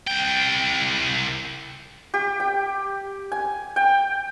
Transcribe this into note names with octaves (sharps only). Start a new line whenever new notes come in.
C2 G5
G4
G5
G#5
G5